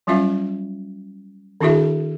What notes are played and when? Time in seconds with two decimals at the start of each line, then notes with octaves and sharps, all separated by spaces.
0.07 F#3 G3 C#4 F4 E5 F5
1.61 D#3 D4 E4 F#4 G#4 E5